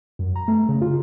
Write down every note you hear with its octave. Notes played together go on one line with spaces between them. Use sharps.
F#2
A#5
A3
C#3
F4